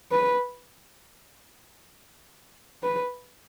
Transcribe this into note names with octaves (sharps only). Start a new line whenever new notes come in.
B4
B4